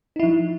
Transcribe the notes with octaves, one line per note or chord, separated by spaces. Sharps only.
F3 D#4 E4